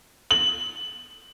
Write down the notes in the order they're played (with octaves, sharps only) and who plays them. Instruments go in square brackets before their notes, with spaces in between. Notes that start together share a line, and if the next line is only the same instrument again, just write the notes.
[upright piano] F#7